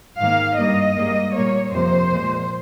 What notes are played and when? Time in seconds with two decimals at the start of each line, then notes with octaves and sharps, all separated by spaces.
0.19 G#2 D#3 A#3 F5
0.58 G2 G3 A#3 D#5
0.97 G#2 G3 A#3
1.35 A#2 G3 A#3 C#5
1.74 F2 C3 F3 A#3 C5
2.12 A#2 F3 G#3